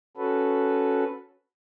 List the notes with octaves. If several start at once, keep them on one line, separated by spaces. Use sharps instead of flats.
C#4 F#4 A4 B4